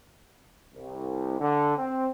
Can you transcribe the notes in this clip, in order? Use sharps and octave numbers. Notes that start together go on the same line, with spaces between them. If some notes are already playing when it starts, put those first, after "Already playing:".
C2
D3
C4